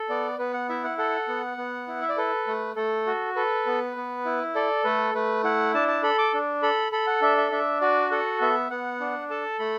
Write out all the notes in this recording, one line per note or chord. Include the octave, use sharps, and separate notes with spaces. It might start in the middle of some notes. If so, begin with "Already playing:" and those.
Already playing: A4
B3 D5
B3 B4
F#5
E4 E5
F#5
A4 F#5
B3
B3
E4
E5
D5
A4 B4
A3
A3 A4
F#4
A4 B4
B3
B3
E4
A4 D5
A3 B4
A3 B4
E4 F#5
D4 A5
A5
A4 B5
D6
D4
A4 B5
A4 B5
F#5
D4 E5
E5
D4 E5
F#4 D5
A4 F#5
B3 E5
B3 F#5
D4
A4 A5
A3 B5